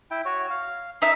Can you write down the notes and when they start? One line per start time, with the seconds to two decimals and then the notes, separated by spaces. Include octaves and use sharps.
0.11 E4 G5
0.25 F#4 C#5
0.50 F5
1.02 D#4 E5